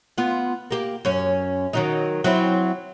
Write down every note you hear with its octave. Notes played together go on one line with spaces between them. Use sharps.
B3 F4
A#3 G4
F#2 C#4
D#3 F#3 D#4
F#3 C4 E4